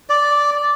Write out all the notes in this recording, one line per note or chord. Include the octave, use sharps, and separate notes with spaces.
D5